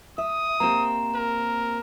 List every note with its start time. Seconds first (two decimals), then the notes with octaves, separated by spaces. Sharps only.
0.18 E5 D#6
0.60 A#3 C4 G4 A#5 E7
1.15 A#4